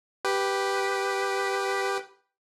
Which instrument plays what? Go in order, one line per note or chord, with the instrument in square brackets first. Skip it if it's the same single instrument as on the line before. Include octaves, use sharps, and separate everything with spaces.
[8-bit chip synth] G4 B4